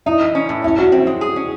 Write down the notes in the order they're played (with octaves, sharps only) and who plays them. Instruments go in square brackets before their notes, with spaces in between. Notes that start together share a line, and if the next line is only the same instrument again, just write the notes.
[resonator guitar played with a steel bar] D#4 [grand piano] E4
[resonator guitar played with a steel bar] E3
C#4
A2
[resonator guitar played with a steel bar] C#4 [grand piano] E4
[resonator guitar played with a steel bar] C#4 [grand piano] F#4
[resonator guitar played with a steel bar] C4 [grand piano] E4
[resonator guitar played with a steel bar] G#3
G#4
C#4